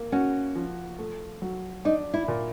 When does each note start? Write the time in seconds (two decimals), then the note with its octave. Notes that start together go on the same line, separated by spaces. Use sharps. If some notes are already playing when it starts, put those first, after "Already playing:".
Already playing: A#3
0.12 C#4 F#4
0.56 F3
0.99 A3
1.42 F#3
1.85 D4 D#4
2.14 E4
2.28 A#2